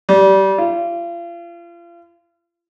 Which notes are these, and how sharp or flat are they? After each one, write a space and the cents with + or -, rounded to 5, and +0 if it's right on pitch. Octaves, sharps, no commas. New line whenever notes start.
G3 -20
F4 -35